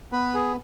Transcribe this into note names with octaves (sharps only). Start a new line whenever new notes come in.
B3 B4
G#4